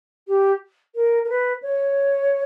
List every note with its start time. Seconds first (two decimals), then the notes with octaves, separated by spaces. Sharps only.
0.28 G4
0.95 A#4
1.24 A#4
1.30 B4
1.63 C#5